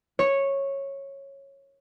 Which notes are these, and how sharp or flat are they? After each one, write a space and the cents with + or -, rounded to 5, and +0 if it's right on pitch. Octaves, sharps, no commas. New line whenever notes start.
C#5 -10